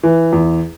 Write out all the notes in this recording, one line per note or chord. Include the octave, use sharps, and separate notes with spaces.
E3
E2